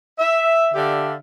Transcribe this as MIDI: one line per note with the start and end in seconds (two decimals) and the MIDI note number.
0.19 0.70 76
0.74 1.14 50
0.74 1.14 62
0.74 1.14 67
0.74 1.14 76
0.74 1.14 77